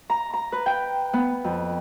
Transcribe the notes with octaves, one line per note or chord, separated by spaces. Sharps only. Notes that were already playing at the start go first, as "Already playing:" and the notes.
A#5
A#5
B4
G5
B3
F2